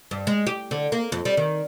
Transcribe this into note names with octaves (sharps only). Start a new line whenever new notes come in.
G2
G#3
G4
D3
A#3
F2
G3
D#3